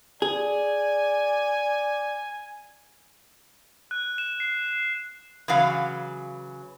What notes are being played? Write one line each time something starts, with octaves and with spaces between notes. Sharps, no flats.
G#4 D5 G#5
F#6
E7
C7
C#3 E3 F#3 F5